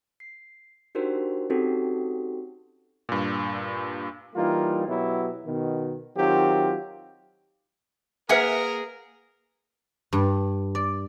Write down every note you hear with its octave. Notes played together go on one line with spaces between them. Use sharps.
C7
D4 D#4 F#4 G4 A#4 C5
C4 C#4 D#4 F#4 G4 A4
G2 A#2
E3 G3 A#3 D#4 F4
B2 F#3 B3 E4 G4
B2 D#3
D#3 F#3 C4 F4 G4
A#3 G#4 A#4 B4 E5 F#5 G#5
G2
D5